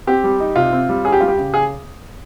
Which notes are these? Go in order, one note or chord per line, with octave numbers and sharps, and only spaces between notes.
C4 G4
G3
D#4
C3 F4
C4
G3
C#4 G#4
G4
G3 F4
G4
C#3
C#3 G#4